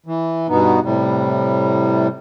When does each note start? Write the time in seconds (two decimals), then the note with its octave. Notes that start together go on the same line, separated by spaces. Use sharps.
0.06 E3
0.49 G2 B2 B3 D#4
0.84 A2 C3 G3